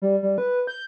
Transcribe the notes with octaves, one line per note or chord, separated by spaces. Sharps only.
G3
G3
B4
G6